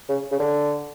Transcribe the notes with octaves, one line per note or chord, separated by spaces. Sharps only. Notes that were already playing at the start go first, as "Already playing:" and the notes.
C#3
C#3
D3